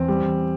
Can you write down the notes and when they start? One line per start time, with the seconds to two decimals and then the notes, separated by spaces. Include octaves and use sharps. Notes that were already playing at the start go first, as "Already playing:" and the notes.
Already playing: E2 C4
0.08 G3
0.22 E2